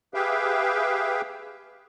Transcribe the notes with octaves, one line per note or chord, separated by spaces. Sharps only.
G4 G#4 B4 E5 F5 G5